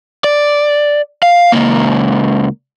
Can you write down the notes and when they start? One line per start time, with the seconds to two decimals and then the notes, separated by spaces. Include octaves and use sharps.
0.24 D5
1.23 F5
1.52 C#2 A#3